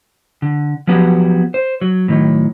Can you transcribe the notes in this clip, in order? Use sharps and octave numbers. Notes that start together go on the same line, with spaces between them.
D3
F3 F#3 B3 F#4 G4
C5
F#3
A2 D#3 F#3